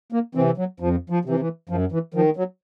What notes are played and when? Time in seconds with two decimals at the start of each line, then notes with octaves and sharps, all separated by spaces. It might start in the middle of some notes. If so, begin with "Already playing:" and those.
0.12 A#3
0.35 C3 E3 C4
0.58 F#3
0.80 F2 F3
1.10 F3
1.25 C3 E3
1.39 E3
1.69 F#2 F3
1.92 E3
2.14 D#3 F3
2.37 F#3